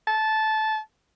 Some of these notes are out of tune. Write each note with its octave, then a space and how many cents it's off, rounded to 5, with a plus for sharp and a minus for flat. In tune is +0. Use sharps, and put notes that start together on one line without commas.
A5 -15